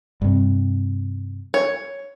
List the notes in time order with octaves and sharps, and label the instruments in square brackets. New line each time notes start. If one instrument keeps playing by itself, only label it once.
[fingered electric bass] G2 C3
[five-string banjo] C#5